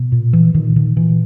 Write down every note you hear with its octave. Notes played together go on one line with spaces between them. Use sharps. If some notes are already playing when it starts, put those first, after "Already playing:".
Already playing: B2
A#2
E3
A#2 D#3
D#3
A#2 E3